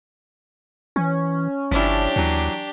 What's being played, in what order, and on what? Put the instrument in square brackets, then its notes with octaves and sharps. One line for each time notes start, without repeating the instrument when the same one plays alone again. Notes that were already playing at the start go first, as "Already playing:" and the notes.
[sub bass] E3 [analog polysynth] C#4
[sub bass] G1 [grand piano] F3 E4 [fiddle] D4 G4
[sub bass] D#2 [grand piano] E3 F#3